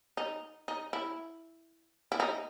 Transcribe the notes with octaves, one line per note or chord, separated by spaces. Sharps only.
D#4
D#4
E4
E4
D#4